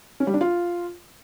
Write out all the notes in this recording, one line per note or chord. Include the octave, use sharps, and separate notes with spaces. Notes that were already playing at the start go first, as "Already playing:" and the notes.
C#4
G3
D4
F4